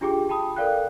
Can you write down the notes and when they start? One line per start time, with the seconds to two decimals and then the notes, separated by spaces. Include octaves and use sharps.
0.01 D4 F4 G4 G#4 G5 D6
0.29 G5 A5 B5 D#6
0.56 A4 A#4 D5 F5 G5 F#6